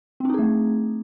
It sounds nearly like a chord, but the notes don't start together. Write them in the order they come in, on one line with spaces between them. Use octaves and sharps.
C4 D4 D#4 G#4 A3